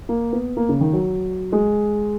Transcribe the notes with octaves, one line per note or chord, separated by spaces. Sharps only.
A#3
B3
A#3
C#3
D#3
F#3
G#3